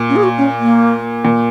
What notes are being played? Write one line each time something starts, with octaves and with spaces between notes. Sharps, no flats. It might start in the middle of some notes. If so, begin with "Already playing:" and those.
Already playing: A#2
C#4
G#4
F#4
C#4
A#3
A#2